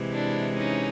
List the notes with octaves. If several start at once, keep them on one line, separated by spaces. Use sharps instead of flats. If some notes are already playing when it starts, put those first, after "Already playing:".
Already playing: C3 E3 G#3
D4 E4
C#4 D#4